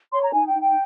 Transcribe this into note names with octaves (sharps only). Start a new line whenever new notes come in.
C#5 C6
A#5
D#4 G#5
G5
D#4
G5